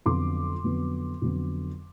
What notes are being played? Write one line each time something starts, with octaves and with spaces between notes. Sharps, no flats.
F2 D3 F#3 B3 C6 D6
F2 D3 F#3 B3
F2 D3 F#3 B3